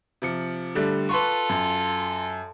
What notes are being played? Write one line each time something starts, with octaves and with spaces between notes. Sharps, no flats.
C3 F3 C#7
D3 G3 A3
F4 A4 B4 C6 C#6
F#2